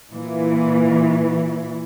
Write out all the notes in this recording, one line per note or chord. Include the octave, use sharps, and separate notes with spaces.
A#2 E3